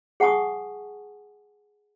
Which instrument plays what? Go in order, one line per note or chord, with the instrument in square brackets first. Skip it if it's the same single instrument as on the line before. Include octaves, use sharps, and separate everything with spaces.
[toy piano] G#4 F#5 G#5 A5 C#6 D#6